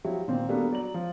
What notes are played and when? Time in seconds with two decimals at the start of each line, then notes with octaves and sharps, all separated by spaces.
0.04 F3 F#3 E4 G4
0.28 A#2 D#3 C4
0.49 G3 A#3 B3 D4 F#4 A4
0.71 F#3 D5 A#5 F#7
0.94 F3